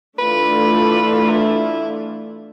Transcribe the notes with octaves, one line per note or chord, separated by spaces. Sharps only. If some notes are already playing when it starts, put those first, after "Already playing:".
E3 A3 D4 F4 B4
E4